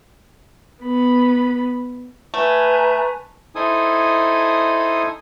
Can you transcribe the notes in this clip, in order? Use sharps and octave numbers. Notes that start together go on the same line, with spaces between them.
B3 B5
A3 B4 G#5 A#5
D#4 E4 A4 C5 G#5 D#6